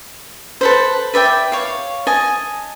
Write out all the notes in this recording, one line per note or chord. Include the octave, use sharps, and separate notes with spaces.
A4 B4 C5
B4 D5 E5 G5
C#5 F5
D#5 G#5 A5